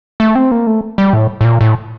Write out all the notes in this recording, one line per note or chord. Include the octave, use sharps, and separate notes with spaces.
A3
C4
A#3
A3
G3
A2
A2
A#2
A2